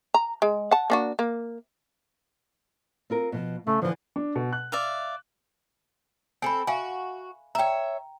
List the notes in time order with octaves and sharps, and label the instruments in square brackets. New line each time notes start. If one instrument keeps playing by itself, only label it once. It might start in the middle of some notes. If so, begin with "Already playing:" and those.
[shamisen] A#5
G#3
F#5 A5
A#3 D4 F#4
A#3
[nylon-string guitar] C4 F4 A#4
B2 F3
[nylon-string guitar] C#3 [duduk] A3
[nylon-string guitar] D3 E3 [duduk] F3
[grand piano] D4
B2
F#6
[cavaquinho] D5 E5 F5
[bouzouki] C4 A4 [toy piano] G#5 B5
[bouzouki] F#4 [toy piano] E5 F5 G#5
[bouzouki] C#5 E5 [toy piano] G5 A#5